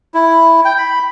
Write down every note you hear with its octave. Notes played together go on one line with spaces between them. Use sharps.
E4
G5
B5